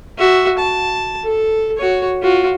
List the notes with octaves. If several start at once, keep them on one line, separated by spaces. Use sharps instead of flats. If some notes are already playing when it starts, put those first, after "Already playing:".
F#4 E5
A5
A4
F#4 C#5
F4 F#4